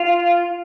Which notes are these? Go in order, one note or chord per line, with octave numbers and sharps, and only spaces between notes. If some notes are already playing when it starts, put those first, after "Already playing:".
Already playing: F4